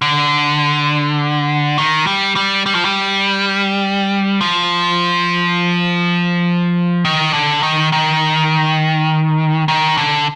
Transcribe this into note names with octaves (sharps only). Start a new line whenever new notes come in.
D3
D#3
G3
G3
G3
F3
G3
F3
D#3
D3
D#3
D#3
D#3
D3